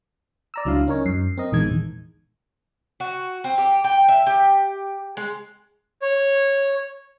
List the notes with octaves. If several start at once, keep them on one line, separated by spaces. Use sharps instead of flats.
D5 A#5 E6
C#2 F#3 D4 E4 F5
C#4 D#4 A#4 C#5
F#2 C7
C4 A#4 D#5
A#1 E2 D#3 G#3 G#6
F#4
C4
G4
G5
E5
G4
G#3
C#5